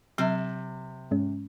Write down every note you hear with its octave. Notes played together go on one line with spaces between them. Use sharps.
C3 F#3
G#2 G#3 C#4